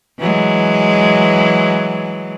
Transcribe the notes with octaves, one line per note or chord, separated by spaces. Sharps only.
E3 F#3 G#3